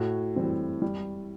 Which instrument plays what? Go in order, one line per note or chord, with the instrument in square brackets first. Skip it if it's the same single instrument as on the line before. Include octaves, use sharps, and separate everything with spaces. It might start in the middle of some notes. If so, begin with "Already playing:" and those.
Already playing: [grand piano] A2 [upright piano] F#4
[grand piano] E3 G3 C4
G3